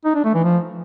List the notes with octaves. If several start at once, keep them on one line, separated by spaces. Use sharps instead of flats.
D#4
D4
A3
E3
F3